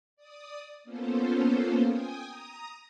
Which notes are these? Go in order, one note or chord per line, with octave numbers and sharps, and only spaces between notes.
D5 D#6
A#3 B3 C#4 F4 A4 C5
G5 G#5 D#6
A#5 D#6